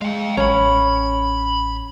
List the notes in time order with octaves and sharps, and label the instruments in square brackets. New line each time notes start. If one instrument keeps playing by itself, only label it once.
[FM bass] G#3 [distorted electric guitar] F5 G5
[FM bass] A1 [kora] C#4 [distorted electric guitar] A#5 B5